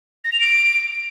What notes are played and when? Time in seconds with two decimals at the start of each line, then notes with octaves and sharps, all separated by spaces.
0.24 A#6
0.32 F7
0.40 D7